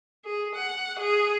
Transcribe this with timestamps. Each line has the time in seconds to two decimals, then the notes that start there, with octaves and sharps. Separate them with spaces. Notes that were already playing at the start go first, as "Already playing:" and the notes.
0.24 G#4
0.55 F#5
0.99 G#4